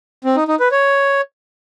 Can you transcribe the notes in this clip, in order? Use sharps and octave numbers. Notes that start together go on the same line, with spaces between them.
C4
D#4
D#4
B4
C#5